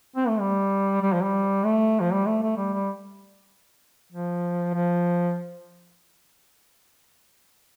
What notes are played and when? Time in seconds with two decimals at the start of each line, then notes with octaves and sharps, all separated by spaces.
0.16 C4
0.28 A3
0.40 G3
1.02 G3
1.13 F3
1.23 G3
1.64 A3
2.00 F3
2.13 G3
2.26 A3
2.42 A3
2.57 G3
2.73 G3
4.12 F3
4.74 F3